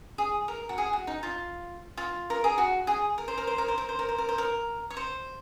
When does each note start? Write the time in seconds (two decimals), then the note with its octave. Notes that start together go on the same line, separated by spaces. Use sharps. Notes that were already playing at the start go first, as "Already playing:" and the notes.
0.18 G#4
0.48 A#4
0.69 F#4
0.78 G#4
0.93 F#4
1.07 D#4
1.23 F4
1.97 F4
2.30 A#4
2.44 G#4
2.58 F#4
2.87 G#4
3.18 A#4
3.28 C5
3.38 A#4
3.47 C5
3.58 A#4
3.68 C5
3.78 A#4
3.89 C5
3.99 A#4
4.09 C5
4.18 A#4
4.29 C5
4.38 A#4
4.90 C#5
4.97 C5